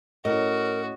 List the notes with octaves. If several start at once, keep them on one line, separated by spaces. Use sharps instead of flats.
A2 C#4 F#4 A#4 D#5